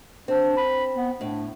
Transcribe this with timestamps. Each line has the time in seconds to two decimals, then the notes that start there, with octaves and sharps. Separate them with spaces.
0.28 C4 D4
0.57 B5
0.95 B3
1.21 A2 D4